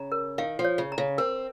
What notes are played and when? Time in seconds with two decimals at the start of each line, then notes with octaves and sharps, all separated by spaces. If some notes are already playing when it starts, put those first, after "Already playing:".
Already playing: C#3 A#5
0.12 A#4
0.38 D#3 F5
0.59 F3
0.65 C#5
0.78 C#3
0.92 A#5
0.98 C#3
1.18 C4 A#4